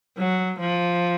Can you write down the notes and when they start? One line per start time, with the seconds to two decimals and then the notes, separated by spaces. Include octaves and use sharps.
0.18 F#3
0.60 F3